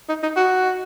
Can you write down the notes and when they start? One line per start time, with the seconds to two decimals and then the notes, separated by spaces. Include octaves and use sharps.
0.09 D#4
0.23 D#4
0.36 F#4